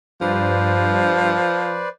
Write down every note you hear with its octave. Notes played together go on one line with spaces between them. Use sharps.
G2 F3 B4 C5 D5